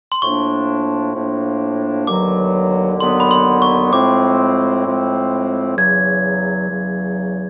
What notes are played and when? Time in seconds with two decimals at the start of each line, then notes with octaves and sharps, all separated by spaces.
0.12 C6
0.22 A2 F3 A#3 D4 C#6
1.15 A2 F3 A#3 D4
2.07 D#2 D3 F#3 B3 D6
3.00 D#2 D3 F#3 B3 C6
3.20 B5
3.31 C6
3.62 C#6
3.93 A2 F3 G#3 C4 D6
4.86 A2 F3 G#3 C4
5.77 E2 C#3 F#3 G#6
6.70 E2 C#3 F#3